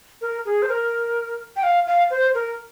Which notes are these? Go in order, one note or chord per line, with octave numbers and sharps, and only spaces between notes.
A#4
G#4
C5
A#4
G5
F5
F5
C5
A#4